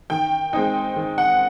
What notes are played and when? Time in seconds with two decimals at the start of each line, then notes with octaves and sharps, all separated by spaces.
0.10 D#3 G5
0.53 G#3 C4 D#4 G5
0.96 D#3
1.18 F#5